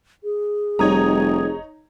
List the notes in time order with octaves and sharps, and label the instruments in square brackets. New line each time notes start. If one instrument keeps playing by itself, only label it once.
[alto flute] G#4
[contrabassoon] F1 [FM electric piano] G3 D#6 G#6 [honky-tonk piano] D#4 C#5 A#5